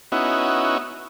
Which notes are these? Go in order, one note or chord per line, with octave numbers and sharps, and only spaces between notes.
B3 C#4 D#4 E4 F#4